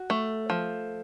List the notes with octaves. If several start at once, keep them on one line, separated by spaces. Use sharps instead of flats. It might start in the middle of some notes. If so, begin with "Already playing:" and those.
Already playing: F#4
A3
F3